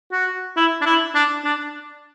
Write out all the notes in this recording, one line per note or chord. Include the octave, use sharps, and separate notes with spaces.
F#4
E4
D4
E4
D4
D4